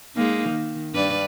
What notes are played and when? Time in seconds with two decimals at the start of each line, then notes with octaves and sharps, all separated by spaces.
0.15 G#3 A#3 D#4
0.50 D#3
0.95 G2 B4 D5